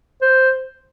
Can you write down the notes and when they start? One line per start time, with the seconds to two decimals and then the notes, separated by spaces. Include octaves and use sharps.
0.22 C5